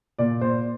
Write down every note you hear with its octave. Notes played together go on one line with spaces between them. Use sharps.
A#2 D5
A#2 C5